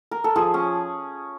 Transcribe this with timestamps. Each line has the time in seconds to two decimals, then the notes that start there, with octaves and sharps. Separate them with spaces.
0.11 A#4
0.24 A4
0.36 F3 G#4
0.54 C#4